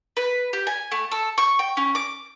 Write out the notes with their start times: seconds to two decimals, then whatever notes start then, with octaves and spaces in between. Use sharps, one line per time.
0.17 B4
0.53 G4
0.67 G#5
0.92 A3
1.12 A4
1.38 C#6
1.59 G5
1.77 C#4
1.95 D6